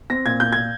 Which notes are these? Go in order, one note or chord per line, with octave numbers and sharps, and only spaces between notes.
C4 A#6
A#2 G#6
A#2 G6
A#2 G#6